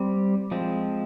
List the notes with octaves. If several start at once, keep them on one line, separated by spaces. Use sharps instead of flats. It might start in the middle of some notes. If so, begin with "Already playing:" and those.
Already playing: G3 C4
F3 G#3 C4